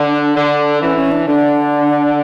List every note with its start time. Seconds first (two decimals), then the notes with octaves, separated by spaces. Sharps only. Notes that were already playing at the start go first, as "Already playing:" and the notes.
Already playing: D3 D4
0.36 D3
0.81 E3 C#4
0.96 C#4
1.11 D4
1.27 D3 D4